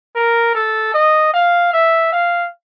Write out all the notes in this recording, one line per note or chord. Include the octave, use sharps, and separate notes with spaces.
A#4
A4
D#5
F5
E5
F5